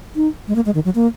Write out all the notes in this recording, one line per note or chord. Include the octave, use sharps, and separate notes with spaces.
D#4
G#3
A#3
G#3
D#3
F#3
A#3